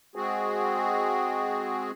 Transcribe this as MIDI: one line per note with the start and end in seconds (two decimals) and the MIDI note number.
0.16 1.91 56
0.16 1.91 60
0.16 1.91 66
0.16 1.91 68